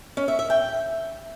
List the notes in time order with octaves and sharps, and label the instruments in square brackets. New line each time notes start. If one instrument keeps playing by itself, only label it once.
[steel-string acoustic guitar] C#4
E5
E5
G5